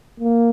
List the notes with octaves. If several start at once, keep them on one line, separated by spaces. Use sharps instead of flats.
A#3